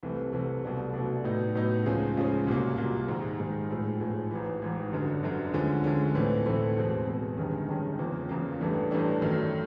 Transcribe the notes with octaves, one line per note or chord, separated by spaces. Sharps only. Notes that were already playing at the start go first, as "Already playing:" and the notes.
C2 C3 E3 A3
C2 C3 E3 A3
C2 B2 F#3 A3 D4
C2 B2 F#3 A3 D4
A2 F#3 B3 D#4
A2 F#3 B3 D#4
C#2 C#3 F3 G#3 C#4
C#2 C#3 F3 G#3 C#4
C2 A#2 F#3 A#3
C2 A#2 F#3 A#3
G#2 D#3 G#3
G#2 D#3 G#3
B1 A2 F3 G#3
B1 A2 F3 G#3
A1 G#2 E3
A1 G#2 E3
G1 F#2 D3
G1 F#2 D3
D2 D3 F3 G#3 C#4
D2 D3 F3 G#3 C#4
B1 A2 E3 A3 C4
B1 A2 E3 A3 C4
E2 B2 G#3 C4
E2 B2 G#3 C4
G1 G2 D#3 G#3 C#4
G1 G2 D#3 G#3 C#4
F#1 E2 C#3 F3 A#3
F#1 E2 C#3 F3 A#3
A1 G2 E3 A3 D4
A1 G2 E3 A3 D4
F#2 D#3 F#3 A3